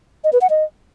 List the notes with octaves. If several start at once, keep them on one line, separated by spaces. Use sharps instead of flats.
D#5
B4
F#5
D#5